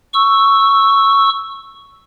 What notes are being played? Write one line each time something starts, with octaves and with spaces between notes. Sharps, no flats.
C#6 E6